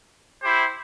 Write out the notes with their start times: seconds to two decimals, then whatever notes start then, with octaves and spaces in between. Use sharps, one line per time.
0.42 E4 G4 C5